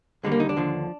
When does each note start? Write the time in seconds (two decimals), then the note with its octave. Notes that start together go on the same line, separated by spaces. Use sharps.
0.23 D#2 D3 G3 G#3
0.32 A#3
0.40 D#4
0.49 D4
0.56 D#2 D3 F3